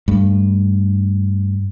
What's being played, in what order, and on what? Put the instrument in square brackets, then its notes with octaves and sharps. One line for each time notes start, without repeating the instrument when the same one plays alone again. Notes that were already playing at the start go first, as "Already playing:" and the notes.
[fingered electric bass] G2 A3